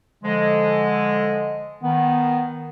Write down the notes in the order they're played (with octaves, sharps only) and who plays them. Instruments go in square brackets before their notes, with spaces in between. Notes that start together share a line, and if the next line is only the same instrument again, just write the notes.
[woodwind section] D3 F3 G#3
[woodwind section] D#3 [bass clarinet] B3